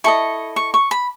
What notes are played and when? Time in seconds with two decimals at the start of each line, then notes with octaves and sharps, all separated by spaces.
0.04 E4 A4 D#5 C#6
0.56 C#6
0.74 C#6
0.91 B5